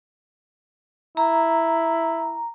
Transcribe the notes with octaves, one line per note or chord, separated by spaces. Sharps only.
E4 A#5